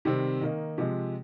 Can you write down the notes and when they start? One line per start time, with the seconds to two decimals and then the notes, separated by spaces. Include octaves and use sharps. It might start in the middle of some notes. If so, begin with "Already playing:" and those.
0.05 C3 D#3 G3 C4
0.41 D#3 A#3 D#4
0.78 C3 F3 G#3